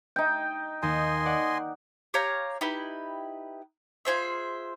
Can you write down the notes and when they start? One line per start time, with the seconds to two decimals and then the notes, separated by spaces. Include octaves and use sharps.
0.16 D#4 G5
0.83 D#2 D#5 G#5 C6
1.25 D5 F#5
2.14 G4 C#5 F5 A#5
2.61 D#4 E4 G4 B4
4.05 F4 G#4 C5 E5